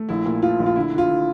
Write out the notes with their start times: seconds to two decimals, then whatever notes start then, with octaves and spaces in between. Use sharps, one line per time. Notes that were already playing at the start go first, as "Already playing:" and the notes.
Already playing: A3
0.09 A#1 E4
0.26 A#2
0.42 F3 F4
0.60 A#1
0.66 F4
0.76 D3 E4
0.93 D3
0.98 F4
1.10 D3